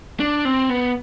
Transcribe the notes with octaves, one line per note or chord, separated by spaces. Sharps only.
D4
C4
B3